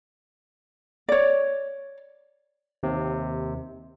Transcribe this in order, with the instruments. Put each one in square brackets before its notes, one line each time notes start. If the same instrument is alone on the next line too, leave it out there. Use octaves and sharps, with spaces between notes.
[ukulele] C#5 D5
[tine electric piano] D#2 C3